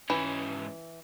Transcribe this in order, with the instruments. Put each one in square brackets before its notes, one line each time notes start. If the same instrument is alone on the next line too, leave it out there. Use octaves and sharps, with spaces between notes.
[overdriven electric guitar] G#2 C#4 [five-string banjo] E3